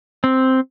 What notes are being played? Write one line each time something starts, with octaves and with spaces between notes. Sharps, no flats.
C4